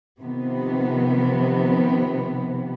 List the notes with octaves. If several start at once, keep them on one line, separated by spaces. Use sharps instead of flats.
C3 D#3 F3 B3